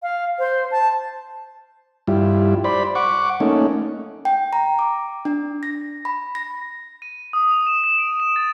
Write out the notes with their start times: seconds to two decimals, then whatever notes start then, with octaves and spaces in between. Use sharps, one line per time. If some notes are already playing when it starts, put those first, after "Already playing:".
0.03 F5
0.39 C5
0.71 A5
2.07 G2 G3 E4 F4
2.64 C5 D5 B5
2.95 F#5 C#6 D6
3.40 A3 A#3 C#4 D#4
4.25 G5
4.53 A#5
4.79 D6
5.25 D4
5.63 A#6
6.05 B5
6.35 A#6
7.02 D#7
7.33 D#6
7.51 F7
7.67 E7
7.84 E7
7.98 D7
8.20 E7
8.36 A6